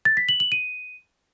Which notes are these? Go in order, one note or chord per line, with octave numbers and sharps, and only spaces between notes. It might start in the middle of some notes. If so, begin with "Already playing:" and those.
A6
B6
F#7
F#7
D#7